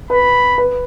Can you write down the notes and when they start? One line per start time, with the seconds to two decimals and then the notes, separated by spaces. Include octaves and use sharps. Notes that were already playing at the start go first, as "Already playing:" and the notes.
0.10 B4 B5
0.58 B4